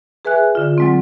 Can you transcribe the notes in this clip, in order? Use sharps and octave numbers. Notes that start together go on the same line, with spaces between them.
G#4 B4 E5 G#5 F#6
D3 F4
F#3 G#3 C4